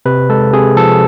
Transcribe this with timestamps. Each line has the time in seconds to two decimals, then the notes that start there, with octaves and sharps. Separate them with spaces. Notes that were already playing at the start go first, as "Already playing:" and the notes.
0.06 C3 B4
0.29 G#3 A4
0.53 C3 G#4
0.77 F3 A4